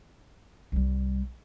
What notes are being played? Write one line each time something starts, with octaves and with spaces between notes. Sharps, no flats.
C2 G3